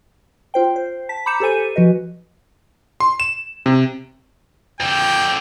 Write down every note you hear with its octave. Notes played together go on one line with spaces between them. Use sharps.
F4 C5 G5
C5
A5 B6
A#5 B5 D6 G6 C#7 E7
G4 A4 C5 G#5 D#7
F3 F#4 B4 D#5
C6
E7
C3
F2 D3 G5